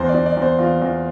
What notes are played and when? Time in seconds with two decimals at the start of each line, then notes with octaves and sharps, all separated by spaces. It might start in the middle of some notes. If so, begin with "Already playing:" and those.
Already playing: E2 C5
0.09 D5
0.14 E2
0.26 D5
0.37 E2 C5
0.59 E2 F4
0.82 E2